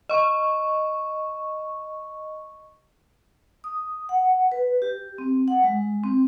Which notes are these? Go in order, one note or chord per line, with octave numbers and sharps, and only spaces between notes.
D#5 C#6
D#6
F#5
B4
G4
C4
F#5
G#3
C4